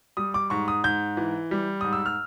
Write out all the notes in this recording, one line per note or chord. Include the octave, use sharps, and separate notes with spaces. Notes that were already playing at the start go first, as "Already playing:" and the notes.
G3 D#6
D6
G#2 C#6
D#6
G#2 G6
E3
G3
G#2 D#6
E6
F6